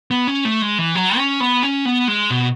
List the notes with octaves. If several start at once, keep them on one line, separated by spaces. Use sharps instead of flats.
B3
C#4
A3
G#3
E3
F#3
C#4
B3
C#4
B3
G#3
B2